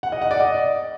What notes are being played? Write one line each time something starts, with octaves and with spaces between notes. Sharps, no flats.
F#5
D#5
F#5
D5
D#5